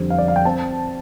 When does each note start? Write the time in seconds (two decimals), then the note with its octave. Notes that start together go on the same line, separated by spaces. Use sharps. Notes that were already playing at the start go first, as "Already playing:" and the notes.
Already playing: F2 D3 G3 C4
0.10 F5
0.18 D5
0.28 F5
0.36 G5
0.45 C4 A5